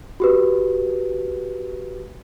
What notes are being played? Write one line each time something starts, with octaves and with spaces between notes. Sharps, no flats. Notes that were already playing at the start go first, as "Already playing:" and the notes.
F#4 G4 B4